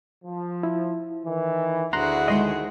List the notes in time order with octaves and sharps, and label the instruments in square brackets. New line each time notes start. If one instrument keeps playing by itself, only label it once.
[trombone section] F3
[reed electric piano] E4
[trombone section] D#3 E3
[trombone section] D2 [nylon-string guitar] D4 [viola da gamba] E4 F#4 G#4 [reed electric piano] A#5 C6 F#6
[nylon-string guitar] D#3 G#3 C5 [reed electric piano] D#5 C6